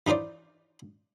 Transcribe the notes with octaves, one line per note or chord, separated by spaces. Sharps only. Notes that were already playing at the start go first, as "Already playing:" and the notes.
E3 D#4 F4 C5 D5